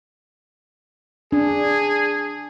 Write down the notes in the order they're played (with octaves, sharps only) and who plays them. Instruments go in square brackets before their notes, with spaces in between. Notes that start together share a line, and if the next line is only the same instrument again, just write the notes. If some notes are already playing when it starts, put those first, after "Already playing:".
[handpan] D4 [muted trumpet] G#4